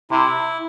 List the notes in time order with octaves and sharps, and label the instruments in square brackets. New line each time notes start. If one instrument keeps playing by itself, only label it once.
[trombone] C3 [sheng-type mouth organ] E4